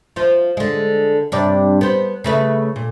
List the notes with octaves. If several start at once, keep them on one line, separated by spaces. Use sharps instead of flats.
F3 F4
D3 G#3
G2 C3 D5
B3 C5
C#3 A3 B4
A#2